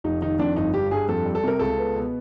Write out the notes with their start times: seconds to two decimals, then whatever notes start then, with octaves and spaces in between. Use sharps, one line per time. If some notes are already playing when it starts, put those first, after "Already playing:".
0.04 F1 D#4
0.22 D#3 D#4
0.39 F2 D4
0.56 G1 D#4
0.73 G3 G4
0.91 G2 G#4
1.09 F2 A4
1.26 G3
1.35 A4
1.44 C3 A#4
1.59 C#2 A4
1.79 B3
1.96 B2